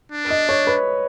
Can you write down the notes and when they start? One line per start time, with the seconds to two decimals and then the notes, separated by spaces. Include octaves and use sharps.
0.12 D4
0.30 D#5
0.49 C#5
0.67 B4